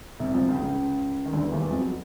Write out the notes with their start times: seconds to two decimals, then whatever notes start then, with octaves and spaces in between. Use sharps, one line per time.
0.20 C2 C3
0.34 F2 F3
0.48 C#2 C#3
0.62 C#2 C#3
1.26 D#3
1.33 D2 D3
1.43 E2 E3
1.52 D#2 D#3
1.61 E2 E3
1.71 F2 F3
1.81 F#3